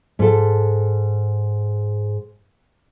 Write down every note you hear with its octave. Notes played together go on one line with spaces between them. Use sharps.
G#2 A4